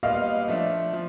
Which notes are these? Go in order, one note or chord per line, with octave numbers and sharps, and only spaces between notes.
A#2 G3 B3 D#5 F5
F3 A3 D4
F3